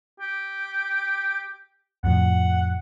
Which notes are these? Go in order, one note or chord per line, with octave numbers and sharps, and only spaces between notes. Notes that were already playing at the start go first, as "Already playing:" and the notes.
G4
F2 A2 F3 F#5